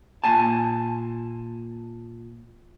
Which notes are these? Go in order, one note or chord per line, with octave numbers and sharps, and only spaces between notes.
A#2 G#5 A5